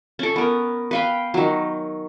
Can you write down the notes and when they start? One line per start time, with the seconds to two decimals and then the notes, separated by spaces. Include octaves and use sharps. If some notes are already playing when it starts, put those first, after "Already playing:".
0.19 C#4 A4
0.36 B3 A#4
0.91 B4 F5 G5
1.34 D#3 F#3